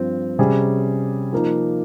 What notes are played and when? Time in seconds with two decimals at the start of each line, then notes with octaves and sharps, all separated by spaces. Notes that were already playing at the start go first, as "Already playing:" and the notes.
Already playing: G2 F3 C4
0.39 C3 G3 C#4 G#4
1.33 F3 A#3 D#4